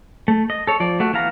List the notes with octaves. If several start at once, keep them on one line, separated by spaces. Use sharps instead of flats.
A3
D#5
A4 C#5
F3 D5
A3 F#4
E3 B3 F5 A#5